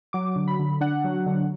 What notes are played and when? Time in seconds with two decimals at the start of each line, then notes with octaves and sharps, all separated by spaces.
0.13 F#3 D6
0.36 D3
0.48 B5
0.59 D3
0.81 D4 F#5
1.04 F#3
1.26 D3